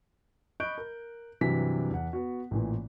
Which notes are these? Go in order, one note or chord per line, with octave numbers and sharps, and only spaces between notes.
D#5 B5 C#6 F#6 G6 D7
A#4
G2 C3 E3 F#3 B6
E2 F#5
B3 F#4
A1 A#2 E3